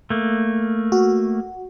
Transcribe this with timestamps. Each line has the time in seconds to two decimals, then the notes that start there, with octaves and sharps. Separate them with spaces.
0.10 A3 A#3
0.92 F#4